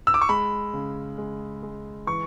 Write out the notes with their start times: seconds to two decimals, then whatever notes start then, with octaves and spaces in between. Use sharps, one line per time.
0.07 E6
0.14 D6
0.21 C#6
0.29 G#3 B5
0.73 C#3
1.18 G#3
1.63 G#3
2.07 E3 C#6